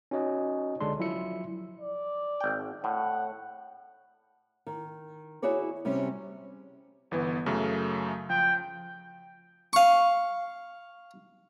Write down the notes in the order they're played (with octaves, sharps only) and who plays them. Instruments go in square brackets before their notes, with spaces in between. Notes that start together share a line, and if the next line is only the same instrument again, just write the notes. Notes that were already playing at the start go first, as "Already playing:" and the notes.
[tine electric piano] C#4 D#4 F#4 C#5 D#5
C#2 D3 G#3 D4 C6
F3 F#3 E4 F4 E5 C#7
[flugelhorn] D5
[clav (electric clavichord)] G#1 G5
[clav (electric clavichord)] A2 [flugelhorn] F#5
[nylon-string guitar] D#3
E4 F#4 G#4 C#5 D5
C3 G3 C#4
[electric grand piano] G1 E3 B3
F#2 C#3 A3
[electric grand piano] F3 [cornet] G5
[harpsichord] F5 C#6